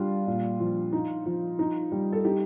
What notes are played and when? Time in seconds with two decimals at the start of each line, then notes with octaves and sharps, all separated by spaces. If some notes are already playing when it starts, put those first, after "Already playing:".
Already playing: G3 D4 F4
0.27 A#2
0.60 F3
0.93 D#4
1.26 F3
1.59 D#4
1.92 G3
2.12 A4
2.25 D#4 G4